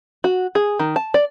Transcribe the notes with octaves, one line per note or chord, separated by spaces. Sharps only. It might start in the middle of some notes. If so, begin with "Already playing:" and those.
F#4
G#4
D#3
A5
D5